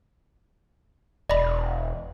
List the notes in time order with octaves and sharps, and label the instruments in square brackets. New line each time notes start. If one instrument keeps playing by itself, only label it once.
[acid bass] E1 [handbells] D5 D#5 B5